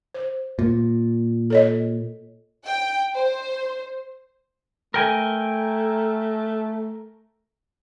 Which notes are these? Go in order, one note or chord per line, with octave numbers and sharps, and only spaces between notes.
C5
A#2
A4 C#5 D#5
G5
C5
A3 A#4 G5 G#5